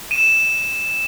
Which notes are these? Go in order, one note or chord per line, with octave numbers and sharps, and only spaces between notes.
D#7 E7